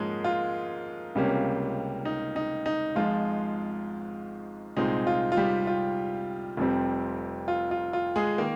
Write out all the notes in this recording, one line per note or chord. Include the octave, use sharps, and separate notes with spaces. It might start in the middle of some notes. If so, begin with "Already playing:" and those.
Already playing: G#2 F3 G#3 A#3 C#4 G#4 A#4
F4
C#2 C3 G3 A#3 C#4
D#4
D#4
D#4
G#1 G#2 F3 G#3 F4
C2 A#2 G#3 C4 D#4
F4
F4
G3 G4
F4
F1 F2 C3 G3 C4
F4
F4
F4
G#3 G#4
D#3 A#3 A#4